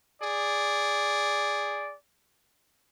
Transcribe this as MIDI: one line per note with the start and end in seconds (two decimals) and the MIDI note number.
0.22 1.95 68
0.22 1.95 74